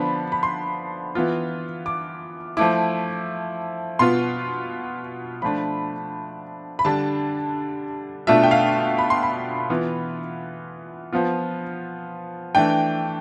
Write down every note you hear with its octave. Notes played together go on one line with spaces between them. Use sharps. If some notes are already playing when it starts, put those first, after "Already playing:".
Already playing: D3 F3 B3 D4 B5
B5
C6
E3 B3 F4
D6
F3 A3 E4 D6
B2 B3 F4 C6
F3 A3 D4 B5
B5
D3 G3 D4 A5
B2 A3 D4 F4 E5
G5
F5
B5
C6
B5
E3 B3 F4
F3 B3 F4
E3 A3 D4 G5